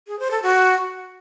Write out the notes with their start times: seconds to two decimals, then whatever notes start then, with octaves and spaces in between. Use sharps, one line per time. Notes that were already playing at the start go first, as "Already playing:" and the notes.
0.08 G#4
0.19 C5
0.31 A4
0.42 F#4